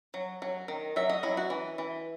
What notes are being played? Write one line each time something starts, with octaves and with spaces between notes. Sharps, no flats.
F#3
F#3
D#3
F#3 E5
D#5
F#3 E4
F#4
E3
E3